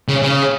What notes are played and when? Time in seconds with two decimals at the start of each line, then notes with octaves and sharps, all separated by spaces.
0.08 C#3
0.23 C#3